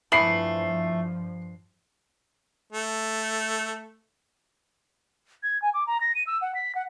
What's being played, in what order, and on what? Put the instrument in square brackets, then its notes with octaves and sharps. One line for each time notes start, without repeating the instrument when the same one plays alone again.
[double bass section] G2 F3 [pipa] E3 A3 B3 [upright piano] C7 F#7
[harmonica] A3
[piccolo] G#6
G#5
D6
A#5
A#6
D#7
E6
F#5
B6
F#5